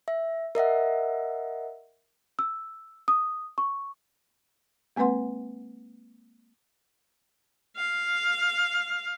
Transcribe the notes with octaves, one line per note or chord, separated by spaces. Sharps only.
E5
A#4 D#5 E5 F#5
E6
D#6
C#6
G#3 A#3 C4 B4 F#5 C6
F5